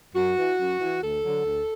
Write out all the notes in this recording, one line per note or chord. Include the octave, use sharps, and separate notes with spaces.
F#2 F#4
E3
F#2
E3
D2 A4
D3 F#3
D2